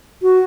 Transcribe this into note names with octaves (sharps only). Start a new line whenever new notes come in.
F#4